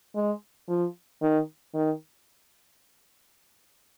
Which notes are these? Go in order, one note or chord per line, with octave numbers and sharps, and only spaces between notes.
G#3
F3
D#3
D#3